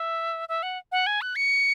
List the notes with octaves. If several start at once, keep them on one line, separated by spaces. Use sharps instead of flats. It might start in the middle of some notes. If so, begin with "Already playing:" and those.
Already playing: E5
E5
F#5
F#5
G#5
F#6
C#7